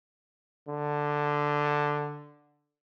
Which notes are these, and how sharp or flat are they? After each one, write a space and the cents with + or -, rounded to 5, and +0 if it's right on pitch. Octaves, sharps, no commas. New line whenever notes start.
D3 +5